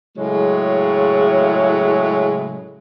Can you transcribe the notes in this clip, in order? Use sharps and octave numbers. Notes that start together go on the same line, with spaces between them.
A2 C#3 F#3 G#3